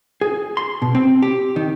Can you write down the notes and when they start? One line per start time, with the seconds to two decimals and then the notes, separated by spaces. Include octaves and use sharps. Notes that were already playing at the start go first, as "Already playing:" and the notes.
0.21 G#4
0.57 C6
0.82 B2
0.95 C4
1.22 G4
1.56 D#3